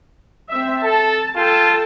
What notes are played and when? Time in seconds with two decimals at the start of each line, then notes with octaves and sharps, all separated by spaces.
0.51 C4 E5
0.84 A4 A5
1.36 F4 A4 G5 A5